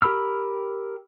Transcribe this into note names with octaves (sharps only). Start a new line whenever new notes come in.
G4 A#4 B5 E6 F6